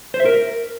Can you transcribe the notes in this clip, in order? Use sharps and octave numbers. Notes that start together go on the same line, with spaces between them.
C5
E5
A#4